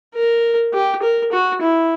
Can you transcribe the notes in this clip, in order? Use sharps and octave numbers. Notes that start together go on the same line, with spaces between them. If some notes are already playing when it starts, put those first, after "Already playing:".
A#4
G4
A#4
F#4
E4